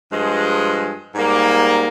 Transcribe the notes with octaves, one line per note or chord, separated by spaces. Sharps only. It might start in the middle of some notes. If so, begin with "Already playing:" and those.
G2 F3 G#3
G#2 G3 A#3